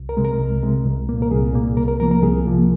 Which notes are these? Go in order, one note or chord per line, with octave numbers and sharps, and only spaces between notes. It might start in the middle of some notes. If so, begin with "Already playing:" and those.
Already playing: C2
A#4
C3 G#3
A#4
C2
C3 G#3
C2
A#2 A#3
A#4
C2 G#4
A#2 A#3
C2 A#4
A#4
C3 F3 A#3 A#4
A#4
C2 G#4
C3 F3 A#3